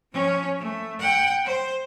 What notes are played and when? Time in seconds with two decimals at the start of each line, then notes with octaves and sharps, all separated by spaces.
0.13 F3 C#4
0.59 A3
0.99 F#5 G5
1.44 C5